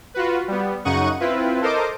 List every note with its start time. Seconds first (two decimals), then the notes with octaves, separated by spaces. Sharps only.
0.14 F4 F#4 B4
0.48 G3 B3
0.85 F#2 C#3 D#4 F#5 C#6 D#7
1.20 C4 E4 F4 B4
1.61 A4 A#4 C5 D#5 D6